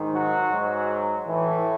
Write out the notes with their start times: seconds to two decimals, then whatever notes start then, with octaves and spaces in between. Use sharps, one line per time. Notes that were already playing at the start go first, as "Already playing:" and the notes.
Already playing: G#2 D#3
0.12 F#3 F#4
0.50 G#2 F#3
1.28 A2 E3